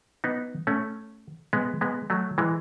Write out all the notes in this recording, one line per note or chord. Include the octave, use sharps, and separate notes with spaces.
B3 D#4
A3 C#4
G#3 B3
G#3 B3
F#3 A3
E3 G#3